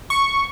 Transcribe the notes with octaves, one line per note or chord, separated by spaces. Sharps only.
C#6